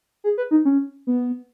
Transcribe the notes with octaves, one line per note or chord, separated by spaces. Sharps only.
G#4
B4
D#4
C#4
B3